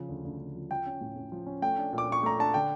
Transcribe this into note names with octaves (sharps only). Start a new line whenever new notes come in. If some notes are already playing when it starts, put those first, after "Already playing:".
Already playing: C#3 F3
D2
D2
C#3
F3
F3 G5
C#4
A2
A2
F3
C#4
A3 G5
D4
A#2
D6
A#2 C#6
A3 A#5
D4 A5
D3 G5